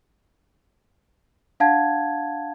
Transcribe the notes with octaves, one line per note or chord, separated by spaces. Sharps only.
D4 F5 F#5 A5 G#6